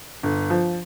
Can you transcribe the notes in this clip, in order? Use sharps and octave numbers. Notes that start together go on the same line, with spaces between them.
G1
F3